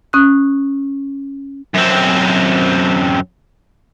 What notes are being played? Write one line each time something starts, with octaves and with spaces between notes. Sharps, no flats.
C#4 D#6 F#6
F#2 C4